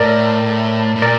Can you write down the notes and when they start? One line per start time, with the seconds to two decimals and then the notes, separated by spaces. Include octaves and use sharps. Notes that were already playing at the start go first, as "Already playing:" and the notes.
Already playing: A2 A#4 D5
0.96 A2
1.02 A#2 A#4 D5